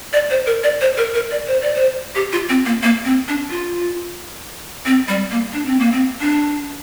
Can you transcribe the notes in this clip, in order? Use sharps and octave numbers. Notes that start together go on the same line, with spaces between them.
D5
C5
A#4
D5
C5
A#4
A#4
D5
C5
D5
C5
G4
F4
C4
A#3
A#3
C4
D4
F4
C4
G3
A#3
D4
C4
A#3
C4
D4